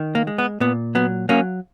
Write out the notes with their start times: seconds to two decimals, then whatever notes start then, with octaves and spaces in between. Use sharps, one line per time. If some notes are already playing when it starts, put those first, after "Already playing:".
Already playing: D#3
0.15 A#3
0.27 G#3
0.38 B3
0.60 A#2 B3
0.95 F#3 B3
1.29 F#3 A#3 C#4